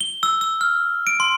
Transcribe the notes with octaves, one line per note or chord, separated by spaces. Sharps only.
G7
E6
E6
F6
D7
C6